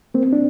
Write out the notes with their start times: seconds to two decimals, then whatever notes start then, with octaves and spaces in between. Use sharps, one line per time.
0.14 A#3 C4
0.33 D4